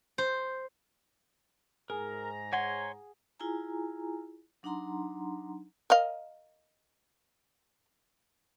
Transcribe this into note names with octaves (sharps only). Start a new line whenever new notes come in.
C5
G#2 G#4 A#4 A#5
C#5 F#5 G#5 C6
E4 F4 G#4 G#5 A#5
F#3 D4 D#4 F#5 A#5 C6
A#4 D#5 F5